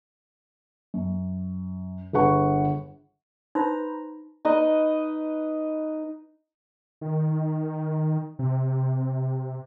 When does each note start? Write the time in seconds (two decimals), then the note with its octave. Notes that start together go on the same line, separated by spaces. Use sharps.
0.94 F#2
2.13 G1 G#4 B4 F#5 C#6
3.55 D#4 B4 C5 A#5
4.45 D#4 B4 D#5
7.01 D#3
8.39 C3